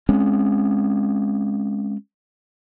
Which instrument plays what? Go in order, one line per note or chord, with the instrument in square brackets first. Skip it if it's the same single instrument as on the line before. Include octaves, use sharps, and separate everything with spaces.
[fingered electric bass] G#3 C4 C#4